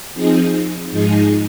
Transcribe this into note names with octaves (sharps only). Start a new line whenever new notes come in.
F3 C4 D#4 G#4
G#2 F3 G#3 D#4 G#4